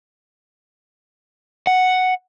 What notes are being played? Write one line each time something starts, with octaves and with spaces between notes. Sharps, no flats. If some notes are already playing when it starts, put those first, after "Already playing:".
F#5